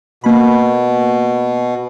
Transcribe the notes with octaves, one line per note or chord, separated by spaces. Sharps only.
B2 A#3 B5